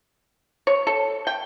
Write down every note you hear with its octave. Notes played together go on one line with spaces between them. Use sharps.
C#5
A4
G5